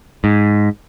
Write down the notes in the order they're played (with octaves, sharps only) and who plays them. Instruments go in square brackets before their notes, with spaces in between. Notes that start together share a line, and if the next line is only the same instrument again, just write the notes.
[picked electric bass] G#2